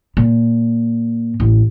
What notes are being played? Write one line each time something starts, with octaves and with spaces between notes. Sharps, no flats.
A#2
A1